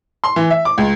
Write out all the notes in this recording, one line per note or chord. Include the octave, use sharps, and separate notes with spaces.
C6
E3
E5
D6
C#2